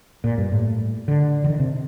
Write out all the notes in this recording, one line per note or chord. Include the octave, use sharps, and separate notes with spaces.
A#2
G2
A2
D3
D3
D#3
C3